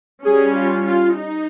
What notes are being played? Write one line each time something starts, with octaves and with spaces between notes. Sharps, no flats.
G3 C#4 G#4
F4
F4
D#4